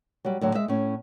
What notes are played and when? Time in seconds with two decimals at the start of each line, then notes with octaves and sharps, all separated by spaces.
0.25 F#3 G3
0.41 A2 D3 F#3
0.54 G#3 E5
0.68 A2 C#4